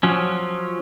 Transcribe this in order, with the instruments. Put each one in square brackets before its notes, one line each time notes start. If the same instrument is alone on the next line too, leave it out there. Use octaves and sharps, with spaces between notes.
[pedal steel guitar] F3 F#3 C#4